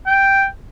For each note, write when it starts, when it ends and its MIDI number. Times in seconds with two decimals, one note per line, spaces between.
0.06 0.45 79